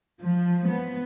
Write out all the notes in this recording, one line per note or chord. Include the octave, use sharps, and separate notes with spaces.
F3
B3